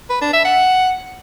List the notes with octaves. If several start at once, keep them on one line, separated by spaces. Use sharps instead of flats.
B4
D4
E5
F#5